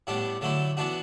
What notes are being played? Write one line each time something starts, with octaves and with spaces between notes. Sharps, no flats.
A2 G3 B3 D4
D3 F#3 A3 E4
E3 B3 D4 F#4